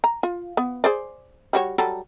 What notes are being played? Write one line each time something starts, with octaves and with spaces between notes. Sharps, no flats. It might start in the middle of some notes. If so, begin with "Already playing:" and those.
A#5
F4
B3
G#4 C5 D5
G3 F#4 C#5
F#3 G3 A4